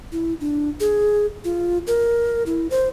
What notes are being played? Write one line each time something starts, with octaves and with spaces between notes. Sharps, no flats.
E4
D4
G#4
F4
A#4
E4
C5